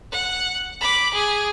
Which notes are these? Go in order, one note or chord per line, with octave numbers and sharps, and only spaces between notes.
F#5
B5 D6
G#4